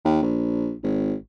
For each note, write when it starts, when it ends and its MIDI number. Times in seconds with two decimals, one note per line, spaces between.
0.05 0.21 39
0.23 0.74 34
0.83 1.15 32